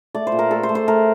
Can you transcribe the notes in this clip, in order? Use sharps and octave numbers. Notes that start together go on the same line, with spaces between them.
A3 D5
C5
A#2
A#4
A3 A4
C5
A3
C5
A3 A#4